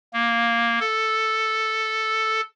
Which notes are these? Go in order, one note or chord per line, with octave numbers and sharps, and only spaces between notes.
A#3
A4